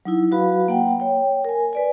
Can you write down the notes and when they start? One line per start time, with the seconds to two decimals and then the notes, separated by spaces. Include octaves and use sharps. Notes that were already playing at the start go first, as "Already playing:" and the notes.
0.05 F#3 D#4 E4
0.32 F#3 F#4 B4 F5 B5
0.68 A#3 F#5 G5
1.00 C#5 G5
1.45 A#4 G#5
1.73 B4 D5 G#5